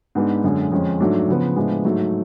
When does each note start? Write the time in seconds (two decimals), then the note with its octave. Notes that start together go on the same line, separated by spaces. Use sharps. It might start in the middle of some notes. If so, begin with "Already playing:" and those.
0.15 G#2 G#3 B3 D4
0.44 F#2 D3 G#3
0.72 F2 F3 G#3 C#4
1.00 G#2 F#3 A3 D4
1.28 C#3 F3 B3
1.56 A2 F3 G#3 B3 D4
1.85 G#2 F#3 A3